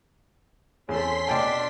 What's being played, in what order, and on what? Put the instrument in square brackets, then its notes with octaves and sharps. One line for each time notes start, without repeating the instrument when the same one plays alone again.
[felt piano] E2 [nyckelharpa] C4 A4 [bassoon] C#4 [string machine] C6 B6
[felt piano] B2 G5 A5 [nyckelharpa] D4 D5